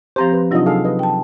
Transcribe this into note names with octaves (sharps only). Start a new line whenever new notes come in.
F3 C4 G4 C5 A#5
B4
C3 F#3 D4 D#4 F4 D#5
G#4 A4 F5
B4 D#5
G5 A5